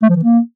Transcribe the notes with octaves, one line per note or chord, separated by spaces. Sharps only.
A3
F3
E3
A#3